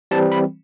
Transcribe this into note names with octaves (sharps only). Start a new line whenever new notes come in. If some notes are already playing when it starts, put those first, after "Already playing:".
E3 G3 C4 A5
B5